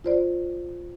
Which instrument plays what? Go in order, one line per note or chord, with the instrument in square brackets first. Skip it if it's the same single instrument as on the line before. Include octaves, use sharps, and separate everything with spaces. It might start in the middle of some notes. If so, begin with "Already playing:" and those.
[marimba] F4 C5 D5